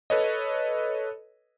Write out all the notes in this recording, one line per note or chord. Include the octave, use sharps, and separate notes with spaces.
A4 B4 C#5 D#5